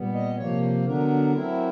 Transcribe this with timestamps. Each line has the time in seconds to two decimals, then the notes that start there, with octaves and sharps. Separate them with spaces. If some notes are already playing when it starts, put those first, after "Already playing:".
Already playing: A#2 G3 B3
0.14 D#5
0.37 C3 F3 A#3 C#5
0.85 D3 F#3 B3 D4 A#4
1.33 F#3 A3 C4 E4